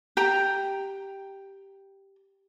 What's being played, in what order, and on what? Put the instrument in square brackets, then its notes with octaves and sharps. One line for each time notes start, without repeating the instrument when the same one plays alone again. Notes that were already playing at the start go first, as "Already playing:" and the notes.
[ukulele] G4 G5 A#5